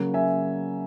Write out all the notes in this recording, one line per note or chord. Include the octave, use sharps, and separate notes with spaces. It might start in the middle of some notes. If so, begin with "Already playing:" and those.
Already playing: C#3 F#3 A#3
E5 G#5